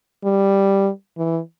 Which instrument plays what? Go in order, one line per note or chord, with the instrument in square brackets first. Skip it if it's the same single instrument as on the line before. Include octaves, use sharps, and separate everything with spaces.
[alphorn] G3
E3